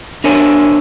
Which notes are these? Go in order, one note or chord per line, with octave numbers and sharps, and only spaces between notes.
D4 A#4 C5 C#5 G#5